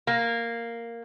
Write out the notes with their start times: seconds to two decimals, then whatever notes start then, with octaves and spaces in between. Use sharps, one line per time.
0.07 A#3